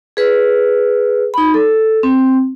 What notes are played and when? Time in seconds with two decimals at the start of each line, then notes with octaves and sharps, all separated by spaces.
0.17 G#4 B4
1.34 D#4 B5
1.54 A4
2.03 C4